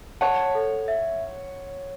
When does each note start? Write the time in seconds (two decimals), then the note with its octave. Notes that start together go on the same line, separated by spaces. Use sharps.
0.21 C#5 F#5 A5
0.55 A4
0.88 E5